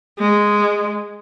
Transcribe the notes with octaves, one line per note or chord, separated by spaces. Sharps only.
G#3